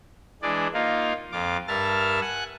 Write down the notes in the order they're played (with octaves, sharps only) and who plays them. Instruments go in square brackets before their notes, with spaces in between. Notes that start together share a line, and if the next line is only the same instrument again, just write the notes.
[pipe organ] E3 G#3 D4 G#4 D5
A#3 D#4 F4
F2 F4 D6
G2 A#4 E5 A5 F6 A6
F#5 G#5 F#6